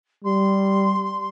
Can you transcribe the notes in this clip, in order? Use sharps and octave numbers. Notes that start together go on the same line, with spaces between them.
G3 C6